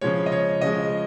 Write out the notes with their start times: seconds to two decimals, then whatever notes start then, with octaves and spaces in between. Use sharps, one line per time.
0.01 C#3 F3 G#3 C#5
0.26 D#5
0.32 C#5
0.61 C#3 F3 G#3 D#5